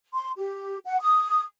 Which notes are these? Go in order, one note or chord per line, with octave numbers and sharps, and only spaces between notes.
C6
G4
F#5
D#6